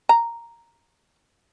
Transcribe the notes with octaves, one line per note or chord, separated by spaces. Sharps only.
A#5